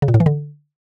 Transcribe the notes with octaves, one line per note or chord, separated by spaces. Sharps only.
C#3
A#2
A2
E3
D3